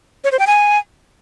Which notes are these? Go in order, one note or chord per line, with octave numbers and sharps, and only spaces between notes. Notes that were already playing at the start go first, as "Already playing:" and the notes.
C#5
C5
G5
G#5